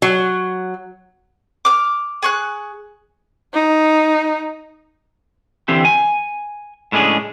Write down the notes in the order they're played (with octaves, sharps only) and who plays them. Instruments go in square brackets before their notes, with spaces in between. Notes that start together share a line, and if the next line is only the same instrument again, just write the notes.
[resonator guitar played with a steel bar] F#3
[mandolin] D6 F6
G#4 C#6 F#6
[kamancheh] D#4
[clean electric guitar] D3 E3 C4 G4
G#5
A2 G#3 C#4 D4 G#4